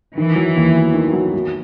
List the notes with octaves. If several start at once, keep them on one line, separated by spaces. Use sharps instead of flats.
D#3 E3
F#3
D#2
B3
D#3
F#3
F#3